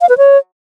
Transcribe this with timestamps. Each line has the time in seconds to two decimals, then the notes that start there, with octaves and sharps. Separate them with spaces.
0.01 F5
0.09 B4
0.18 C#5